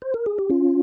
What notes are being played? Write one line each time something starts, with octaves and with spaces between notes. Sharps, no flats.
C5
A#4
G#4
G4
C#4 F4